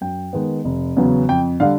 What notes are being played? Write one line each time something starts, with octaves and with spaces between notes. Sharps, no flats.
F#2 G5
D#3 G#3 B3
F1
E2 C#3 F#3 B3
F2 G5
D3 G3 F5